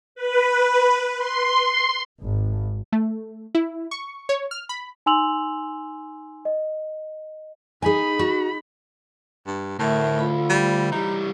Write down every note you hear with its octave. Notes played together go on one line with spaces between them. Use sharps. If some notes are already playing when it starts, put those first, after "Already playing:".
B4
C6
G#1
A3
E4
C#6
C#5
F6
B5
D#4 G#5 C6 E6 F7 F#7
D#5
D#4 G#4 G#5 B5
F#4
G2
D2 A2 A#4 E5
F4 B5
G3
E3 G3 D#4